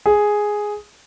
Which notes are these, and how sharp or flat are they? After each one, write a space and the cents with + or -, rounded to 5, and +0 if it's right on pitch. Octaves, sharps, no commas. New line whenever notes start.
G#4 +0